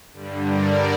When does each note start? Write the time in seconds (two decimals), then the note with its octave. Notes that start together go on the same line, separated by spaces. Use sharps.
0.13 G2 D3 G3
0.45 A#4 D5